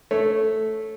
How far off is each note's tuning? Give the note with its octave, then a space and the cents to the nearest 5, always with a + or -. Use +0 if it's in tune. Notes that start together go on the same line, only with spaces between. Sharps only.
A3 -5 C#5 +0